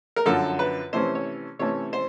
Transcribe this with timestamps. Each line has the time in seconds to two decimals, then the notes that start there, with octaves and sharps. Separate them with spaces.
0.16 A#4
0.26 F#2 D3 F3 A4
0.59 B4
0.93 C3 E3 A3 C#4 C5
1.15 C#5
1.59 C3 E3 A3 C#4 C#5
1.93 C5